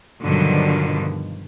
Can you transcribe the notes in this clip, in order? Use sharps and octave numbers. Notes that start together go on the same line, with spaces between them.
G2 B2 D3 D#3 F3 F#3